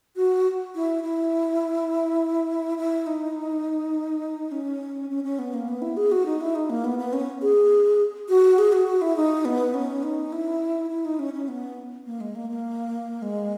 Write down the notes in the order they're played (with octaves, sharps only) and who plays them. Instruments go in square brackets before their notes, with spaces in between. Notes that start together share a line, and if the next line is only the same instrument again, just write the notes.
[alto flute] F#4
E4
E4
E4
D#4
C#4
C#4
C#4
B3
A#3
B3
E4
G#4
F#4
D#4
E4
D#4
A#3
B3
B3
C#4
G#4
F#4
G#4
F#4
F#4
E4
D#4
B3
C#4
D#4
E4
E4
D#4
C#4
C#4
B3
A#3
G#3
A#3
A#3
G#3